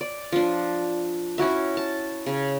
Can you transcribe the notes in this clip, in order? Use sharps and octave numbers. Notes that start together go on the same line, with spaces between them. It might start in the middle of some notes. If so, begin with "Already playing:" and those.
D5
F3 D4
C#4 E4 F#4 E5
A5
C#3